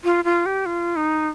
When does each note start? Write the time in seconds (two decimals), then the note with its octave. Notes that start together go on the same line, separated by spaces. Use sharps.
0.04 F4
0.24 F4
0.46 G4
0.66 F4
0.96 D#4